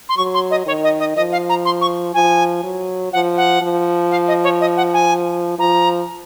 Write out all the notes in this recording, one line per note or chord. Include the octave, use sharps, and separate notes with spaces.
C6
F#3 C#6
C6
D#5
D#3 C#5
D#5
D#5
F3 D#5
F5
A#5
C6
C#6
F3 G#5
F#3
F3 F#5
F#5
F3
F5
D#5
C#5
D#5
F#5
G#5
F3 A#5